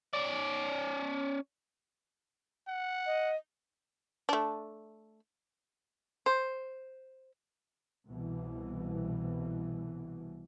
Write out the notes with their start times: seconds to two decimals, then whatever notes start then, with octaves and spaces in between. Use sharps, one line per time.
0.13 C#4 D5
2.68 F#5
3.06 D#5
4.29 A3 D4
6.26 C5
8.06 C2 B2 E3